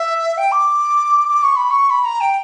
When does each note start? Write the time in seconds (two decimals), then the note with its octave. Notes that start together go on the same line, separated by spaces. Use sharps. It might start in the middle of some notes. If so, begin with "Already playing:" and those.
Already playing: E5
0.38 G5
0.52 D6
1.28 D6
1.43 C#6
1.56 B5
1.70 C#6
1.90 B5
2.05 A#5
2.21 G5